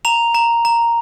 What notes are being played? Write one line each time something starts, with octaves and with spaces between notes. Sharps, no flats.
A#5 F7
A#5
A#5